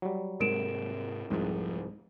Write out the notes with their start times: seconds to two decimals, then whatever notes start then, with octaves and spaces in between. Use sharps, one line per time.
0.02 F#3 G3
0.40 G#2 C3 G#3 A#4 D7 E7
1.30 F1 C2 G#2 F3